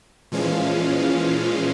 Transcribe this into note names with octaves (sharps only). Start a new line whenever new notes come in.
A#2 E3 F3 G#3 C#4 F5